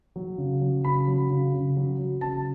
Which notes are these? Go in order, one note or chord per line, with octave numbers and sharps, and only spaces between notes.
F#3
C#3
F#3
C#3 B5
F#3
C#3
C#3
F#3
F#3
C#3 A5